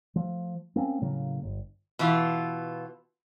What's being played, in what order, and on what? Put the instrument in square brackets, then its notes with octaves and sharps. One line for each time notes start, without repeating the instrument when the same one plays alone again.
[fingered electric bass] F3 A3
A#3 C4 C#4
A2 C#3 F#3 A#3
G1
[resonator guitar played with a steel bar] B2 E3 F4